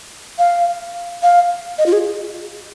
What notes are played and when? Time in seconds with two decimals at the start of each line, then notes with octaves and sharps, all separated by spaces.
0.38 F5
1.23 F5
1.78 D#5
1.86 F4
1.93 G#4